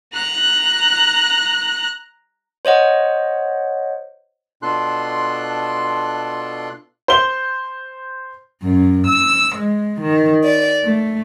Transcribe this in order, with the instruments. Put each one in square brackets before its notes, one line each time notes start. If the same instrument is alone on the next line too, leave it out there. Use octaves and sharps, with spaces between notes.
[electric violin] A#5 F#6
[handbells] C5 C#5 D#5 F#5
[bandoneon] B2 D4 F4 A4 C6 F#6
[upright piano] C5 G7
[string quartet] F#2
E6
G#3
D#3
D5
A3